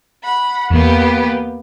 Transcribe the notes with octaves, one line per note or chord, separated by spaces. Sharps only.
F#5 B5
E2 A#3 B3 G4